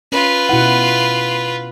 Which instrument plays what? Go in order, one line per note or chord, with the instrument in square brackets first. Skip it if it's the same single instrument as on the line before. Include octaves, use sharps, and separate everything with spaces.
[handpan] C#4 [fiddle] F4 B4
[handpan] B2 E4 F#5